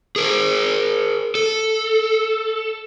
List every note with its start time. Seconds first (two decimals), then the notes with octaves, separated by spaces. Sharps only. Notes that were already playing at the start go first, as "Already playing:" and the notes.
0.16 G#4 A#4
1.35 A4